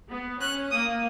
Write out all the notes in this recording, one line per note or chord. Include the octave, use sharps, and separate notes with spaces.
B3
C#4 F#6
A#3 D#6